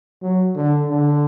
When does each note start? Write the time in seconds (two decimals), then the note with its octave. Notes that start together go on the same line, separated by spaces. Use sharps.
0.22 F#3
0.55 D3
0.88 D3